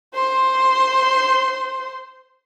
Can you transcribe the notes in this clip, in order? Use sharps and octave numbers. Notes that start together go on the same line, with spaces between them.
C5 C6